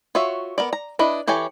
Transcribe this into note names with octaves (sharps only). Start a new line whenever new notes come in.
F4 F#4 C#5 E5
B3 A#4 D5
A#5
D4 E4 B4 D#5
E3 G4 A4 C#5 G#5